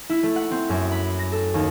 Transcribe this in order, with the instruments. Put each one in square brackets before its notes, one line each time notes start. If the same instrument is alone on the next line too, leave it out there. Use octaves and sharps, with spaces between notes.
[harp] E4
A3
F#5
C4
F#2
B5
A#6
A4
D#2